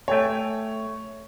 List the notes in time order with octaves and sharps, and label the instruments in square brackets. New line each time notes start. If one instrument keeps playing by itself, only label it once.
[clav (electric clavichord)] A3 G5 G#5 [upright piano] C#5